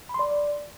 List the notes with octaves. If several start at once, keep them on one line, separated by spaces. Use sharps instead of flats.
B5
C6
D5